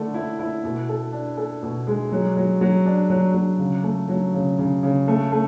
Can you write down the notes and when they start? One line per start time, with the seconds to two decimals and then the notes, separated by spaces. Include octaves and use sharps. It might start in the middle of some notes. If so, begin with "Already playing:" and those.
Already playing: D3 A3 E4
0.14 E4
0.39 E4
0.64 B2
0.89 A4
1.12 D4
1.37 A4
1.63 B2
1.87 G#3
2.12 F#3
2.37 F#3
2.61 F#3
2.86 D4
3.10 F#3
3.34 F#3
3.59 C#3
3.83 A3
4.09 F#3
4.33 C#3
4.58 C#3
4.83 C#3
5.08 A3
5.32 A3